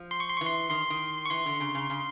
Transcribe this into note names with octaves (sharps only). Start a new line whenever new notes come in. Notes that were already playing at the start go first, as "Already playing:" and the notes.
Already playing: F3
C6
C#6
C6
E3 C#6
C6
D#3 C6
D#3
C#6
E3 C6
D3
C#3
C#3
C#3